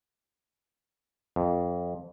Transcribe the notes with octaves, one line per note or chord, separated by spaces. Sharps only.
F2